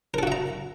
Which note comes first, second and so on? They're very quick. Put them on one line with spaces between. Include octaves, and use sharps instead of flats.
A#4 A4 F#4 E5 A#5